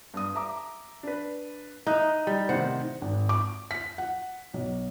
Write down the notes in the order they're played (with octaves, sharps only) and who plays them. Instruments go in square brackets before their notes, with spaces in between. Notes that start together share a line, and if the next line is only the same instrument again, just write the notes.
[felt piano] G2 D#6
E5 A#5 D6
D4 B4
[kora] D#4 [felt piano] E5 D#6 F#6
[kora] G3
[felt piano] A2 C3 D#3 [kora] C5 F#5
[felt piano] G#1
D6
B6
F#5
B1